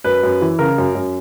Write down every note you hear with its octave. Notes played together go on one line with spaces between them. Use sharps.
F#2 B4
F#2
E3
C#3 A#4
F#2
F#2